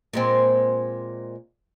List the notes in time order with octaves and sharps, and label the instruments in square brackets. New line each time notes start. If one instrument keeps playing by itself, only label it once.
[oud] A#2 G#3 C4